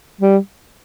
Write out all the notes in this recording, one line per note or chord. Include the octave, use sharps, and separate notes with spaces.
G3